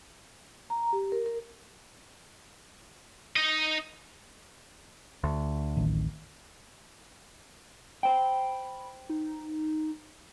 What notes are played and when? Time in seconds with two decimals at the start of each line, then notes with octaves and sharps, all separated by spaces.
0.70 A#5
0.93 G4
1.12 A#4
1.26 A#4
3.36 D#4 D#5
5.24 D2
5.77 D1 A1 D#3
8.03 C5 G5 B5
9.09 D#4